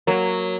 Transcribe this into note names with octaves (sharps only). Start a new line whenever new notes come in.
F#3 A#3